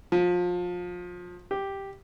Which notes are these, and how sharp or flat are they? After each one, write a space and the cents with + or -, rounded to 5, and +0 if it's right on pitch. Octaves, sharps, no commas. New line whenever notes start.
F3 +25
G4 +0